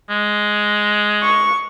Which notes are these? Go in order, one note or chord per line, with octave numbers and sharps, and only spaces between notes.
G#3
C#6